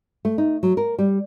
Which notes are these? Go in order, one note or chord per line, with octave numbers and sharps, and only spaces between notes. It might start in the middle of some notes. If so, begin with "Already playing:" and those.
A3
D#4
F#3
A#4
G3